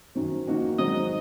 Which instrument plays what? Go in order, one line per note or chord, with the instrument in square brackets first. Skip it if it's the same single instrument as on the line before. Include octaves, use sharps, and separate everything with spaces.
[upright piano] F#2 D#3 F#3 C4
F2 D#3 A#3 D#4 F#4
[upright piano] G#1 G#2 F#3 C4 [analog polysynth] D#5